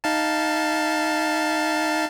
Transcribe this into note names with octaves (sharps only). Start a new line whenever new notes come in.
D#4 F5 A5